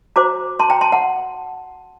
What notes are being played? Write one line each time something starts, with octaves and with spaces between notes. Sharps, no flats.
F#4 C5 A#5 D6
A5 C6
G5 A#5
A5 C6
F#5 A5